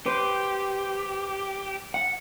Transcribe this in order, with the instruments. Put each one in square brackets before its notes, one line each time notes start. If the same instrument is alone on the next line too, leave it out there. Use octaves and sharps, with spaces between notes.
[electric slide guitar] G4 [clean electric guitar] B4 C5
[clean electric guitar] F#5